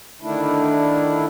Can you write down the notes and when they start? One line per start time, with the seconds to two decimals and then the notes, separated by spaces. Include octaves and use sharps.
0.22 D3 D#3 A3 D4 E4